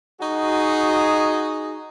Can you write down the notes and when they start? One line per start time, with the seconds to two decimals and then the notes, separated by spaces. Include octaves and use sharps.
0.21 D#4 F#4 G#4